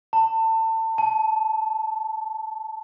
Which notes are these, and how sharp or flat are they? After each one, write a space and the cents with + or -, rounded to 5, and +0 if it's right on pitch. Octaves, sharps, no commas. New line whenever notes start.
A5 +25
A5 -20